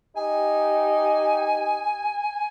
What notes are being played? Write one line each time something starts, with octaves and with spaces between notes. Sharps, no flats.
D#4 G4 G#5